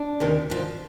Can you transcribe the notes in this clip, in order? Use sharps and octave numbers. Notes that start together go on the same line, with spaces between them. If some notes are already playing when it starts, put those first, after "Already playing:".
Already playing: D4
D2 C3 D#3
G#2 F3